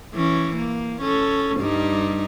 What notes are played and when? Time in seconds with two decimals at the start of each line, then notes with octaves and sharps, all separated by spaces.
0.14 E3 C#4
0.56 A#3
1.02 C#4 A4
1.57 G2 G3 D#4